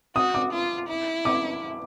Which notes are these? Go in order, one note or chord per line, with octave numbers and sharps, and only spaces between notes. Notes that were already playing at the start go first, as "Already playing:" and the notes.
F#4 D#6
D6
F4
E4
D6